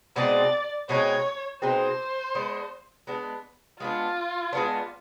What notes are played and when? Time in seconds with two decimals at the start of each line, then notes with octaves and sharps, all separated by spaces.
0.16 B2 G#3 C4 D#4 D5
0.89 B2 G#3 C4 D#4 C#5
1.62 B2 G#3 C4 D#4 C5
2.35 G#3 B3 D4
3.07 G#3 B3 D4
3.80 G#3 B3 D4 F4
4.53 G#3 B3 D4